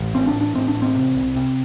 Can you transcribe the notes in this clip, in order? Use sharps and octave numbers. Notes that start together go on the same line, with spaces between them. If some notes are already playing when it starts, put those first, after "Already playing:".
Already playing: A1
A2 C4
D4
A1
D4
A2 C4
D4
A1
C4
C3
C2
C3